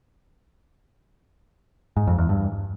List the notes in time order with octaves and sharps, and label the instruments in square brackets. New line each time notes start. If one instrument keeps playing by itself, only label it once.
[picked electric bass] G#2
F2
E2
G2